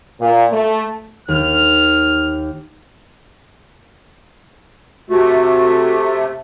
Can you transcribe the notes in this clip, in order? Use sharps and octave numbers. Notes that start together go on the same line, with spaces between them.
A#2
A3
D#2 F6
C3 A3 F#4